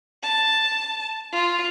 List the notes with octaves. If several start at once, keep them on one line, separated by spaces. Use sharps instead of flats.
A5
F4